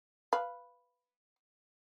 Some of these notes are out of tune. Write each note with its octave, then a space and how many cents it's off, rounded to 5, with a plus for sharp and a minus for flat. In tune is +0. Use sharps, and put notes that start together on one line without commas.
B4 +0 F5 -10